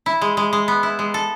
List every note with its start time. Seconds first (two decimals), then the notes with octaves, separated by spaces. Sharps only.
0.06 E4
0.21 G#3
0.37 G#3
0.53 G#3
0.68 B3
0.83 E4
0.99 G#3
1.14 A4